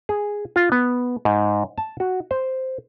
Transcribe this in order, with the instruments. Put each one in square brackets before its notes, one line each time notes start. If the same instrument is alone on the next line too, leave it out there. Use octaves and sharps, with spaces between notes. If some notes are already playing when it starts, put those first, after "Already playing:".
[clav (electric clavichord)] G#4
F4
B3
G#2
A5
F#4
C5